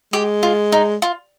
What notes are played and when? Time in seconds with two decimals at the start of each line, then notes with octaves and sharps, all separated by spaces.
0.13 G#3 G4
0.43 F4
0.72 D#4
1.02 F4